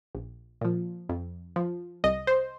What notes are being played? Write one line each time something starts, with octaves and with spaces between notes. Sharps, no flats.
A#1
A#2 F3
F2
F3
C2 D#5
C5